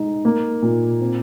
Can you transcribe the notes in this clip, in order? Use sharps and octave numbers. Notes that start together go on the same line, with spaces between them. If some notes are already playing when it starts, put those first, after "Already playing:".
Already playing: G#3 D#4
A#3
A#2
C4